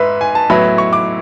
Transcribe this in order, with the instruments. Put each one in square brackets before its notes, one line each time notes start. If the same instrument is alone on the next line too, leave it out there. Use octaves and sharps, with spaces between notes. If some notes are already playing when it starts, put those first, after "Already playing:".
Already playing: [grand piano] G#2 B4 E5
G#5
A5
A2 F#3 B3 E4 B5
C#6
D6